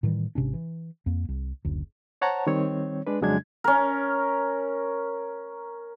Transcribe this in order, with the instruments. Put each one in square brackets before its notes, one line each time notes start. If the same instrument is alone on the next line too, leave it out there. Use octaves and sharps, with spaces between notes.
[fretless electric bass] A2 D#3 E3 G3
G#1 C3 C#4 D4
E3
F2 A#3
C2
F#1 D2
[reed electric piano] C5 C#5 F#5 A5 A#5
D#3 G3 C4 C#5
G#3 D4 B4
F2 C#3 F#3 G#3 D4 G#6
[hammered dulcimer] C#4 A#4